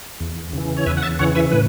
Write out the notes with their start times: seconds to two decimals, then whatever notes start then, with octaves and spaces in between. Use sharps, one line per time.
0.20 E2
0.53 C#3 E3
0.77 C#5
0.86 E2 B4 E5
0.97 F#5
1.03 E5 A5
1.19 C#3 E3 C#5 F#5
1.35 B4 E5
1.52 A2 B4